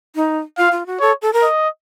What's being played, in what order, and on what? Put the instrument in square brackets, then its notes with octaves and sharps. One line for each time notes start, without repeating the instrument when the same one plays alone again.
[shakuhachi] D#4
[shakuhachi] F4 [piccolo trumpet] F5
[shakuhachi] F4
F#4
[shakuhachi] A4 [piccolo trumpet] C#5
[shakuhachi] A4
A#4
[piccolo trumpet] D#5